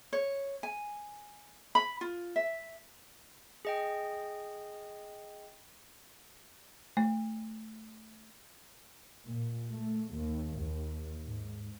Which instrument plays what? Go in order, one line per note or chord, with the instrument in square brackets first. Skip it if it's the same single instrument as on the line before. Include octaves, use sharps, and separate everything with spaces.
[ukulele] C#5
G#5
B5
F4
E5
[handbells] G#4 D#5 G5
[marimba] A3
[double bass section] A#2
A3
D#2
D#2
G#2